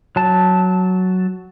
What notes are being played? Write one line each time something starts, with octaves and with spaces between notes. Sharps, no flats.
F#3 A5